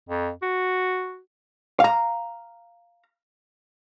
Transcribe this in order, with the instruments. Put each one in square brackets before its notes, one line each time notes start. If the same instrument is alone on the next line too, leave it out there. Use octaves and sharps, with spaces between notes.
[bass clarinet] F2
F#4
[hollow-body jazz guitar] F5 A#5